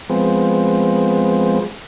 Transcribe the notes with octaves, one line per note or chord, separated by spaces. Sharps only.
F3 G#3 B3 C4